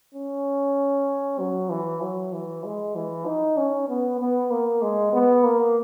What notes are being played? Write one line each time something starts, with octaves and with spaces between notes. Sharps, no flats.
C#4
F#3
E3
F#3
E3
G#3
E3
D#4
C#4
B3
B3
A#3
G#3
B3
A#3